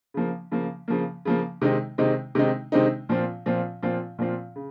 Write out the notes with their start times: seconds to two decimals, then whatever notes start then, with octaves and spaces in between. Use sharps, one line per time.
0.14 C#3 F3 A#3
0.51 C#3 F3 A#3
0.88 C#3 F3 A#3
1.25 C#3 F3 A#3
1.62 C3 D#3 G#3 C4 D#4
1.98 C3 D#3 G#3 C4 D#4
2.35 C3 D#3 G#3 C4 D#4
2.72 C3 D#3 G#3 C4 D#4
3.09 A#2 F3 C4 F4
3.46 A#2 F3 C4 F4
3.83 A#2 F3 C4 F4
4.19 A#2 F3 C4 F4
4.56 C#3